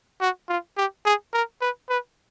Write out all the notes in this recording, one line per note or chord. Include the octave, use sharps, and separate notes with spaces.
F#4
F4
G4
G#4
A#4
B4
B4